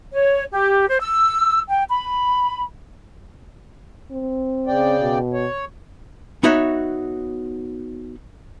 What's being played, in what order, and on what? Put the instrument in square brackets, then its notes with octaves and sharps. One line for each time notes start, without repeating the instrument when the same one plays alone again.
[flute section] C#5
G4
C5
E6
G5
B5
[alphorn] C4
[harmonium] C#3 D5 G5
[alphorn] B2
[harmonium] C#5
[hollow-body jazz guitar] B3 D#4 F#4 C#5 E5